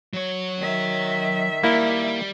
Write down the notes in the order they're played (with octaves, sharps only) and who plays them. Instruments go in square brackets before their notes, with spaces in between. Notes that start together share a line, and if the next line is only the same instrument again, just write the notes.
[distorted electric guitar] F#3 C#5
[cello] D#3 E5
[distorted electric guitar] G3 [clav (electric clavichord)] A#3 E4